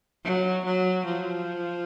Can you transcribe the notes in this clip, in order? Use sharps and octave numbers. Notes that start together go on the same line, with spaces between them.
F#3
F#3
F3